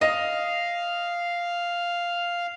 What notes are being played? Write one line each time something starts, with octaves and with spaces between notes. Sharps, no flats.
D#5 F5